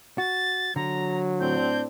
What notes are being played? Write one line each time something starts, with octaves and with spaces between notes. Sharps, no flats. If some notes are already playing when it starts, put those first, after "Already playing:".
F#4 A6
D3 F#3 A#5
A2 C4 D4 G6